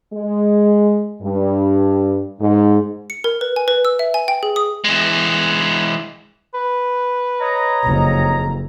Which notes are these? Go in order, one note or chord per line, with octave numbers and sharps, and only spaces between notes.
G#3
G2
G#2
C#7
A#4
B4
G#5
B4
E6
E5
G#5
G5
G#4
D#6
E3 G#3
B4
C#5 D#5 A#5
F#1 F2